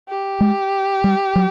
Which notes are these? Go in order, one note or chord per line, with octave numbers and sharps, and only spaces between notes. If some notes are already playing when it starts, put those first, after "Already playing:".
G4
G#3
G3
F#3